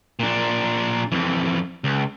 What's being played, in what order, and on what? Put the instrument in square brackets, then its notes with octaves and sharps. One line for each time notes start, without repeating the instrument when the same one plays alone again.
[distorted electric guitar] A#2 D4
F2 E3
C#2